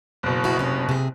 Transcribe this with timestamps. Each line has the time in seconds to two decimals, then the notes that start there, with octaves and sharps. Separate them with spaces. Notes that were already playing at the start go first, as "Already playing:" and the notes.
0.23 F#1 B2
0.44 F2 E4 F#4
0.59 C3 C#4
0.89 C3 G#4